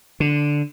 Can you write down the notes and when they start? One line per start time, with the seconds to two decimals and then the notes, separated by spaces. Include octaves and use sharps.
0.20 D3